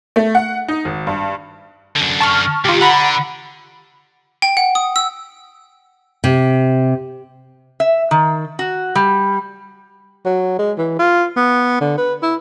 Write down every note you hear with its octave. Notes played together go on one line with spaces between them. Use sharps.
A3
F#5
D#4
G#1
G2
F#2 D3
A5 C#6 F6
C#2 D#3 F4 G4
D3 F#5 A#5 B5
G5
F#5
D#6
E6
C3
E5
D#3
F#4
G3
F#3
G#3
E3
F4
B3
D3
B4
E4